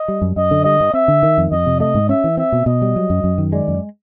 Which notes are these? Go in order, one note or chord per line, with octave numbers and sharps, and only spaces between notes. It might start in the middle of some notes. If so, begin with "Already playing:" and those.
Already playing: D#5
G3
F#2
F#2 D#5
D3
G3 D#5
G2
C4 E5
D3
D#3
F2
F2 D#5
C3
A3 D#5
G#2
C#4 E5
E3
C4 E5
B2
B2 D#5
G3
F#3
F#2
F#2
D#3
G#3 D5
F#2